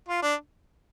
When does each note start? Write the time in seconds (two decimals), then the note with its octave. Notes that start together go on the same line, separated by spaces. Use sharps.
0.08 F4
0.22 D4